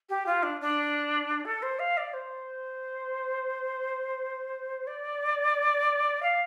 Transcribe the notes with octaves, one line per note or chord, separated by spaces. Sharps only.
G4
F4
D4
D4
A4
C5
F5
D5
C5
D5
F5